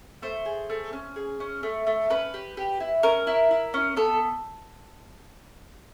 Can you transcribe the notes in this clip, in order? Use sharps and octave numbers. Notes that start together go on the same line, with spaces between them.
A3 C5
G#4
A3
C#4
G#4
C#4
A3
A3
C#4 B4
G4
G4
E4
C#4 A#4
E4
E4
C#4
B3 A4